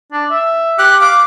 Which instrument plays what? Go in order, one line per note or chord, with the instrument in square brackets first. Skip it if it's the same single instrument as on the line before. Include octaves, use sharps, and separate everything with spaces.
[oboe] D4
E5
[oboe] G4 [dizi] F#6
[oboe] F5 [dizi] D6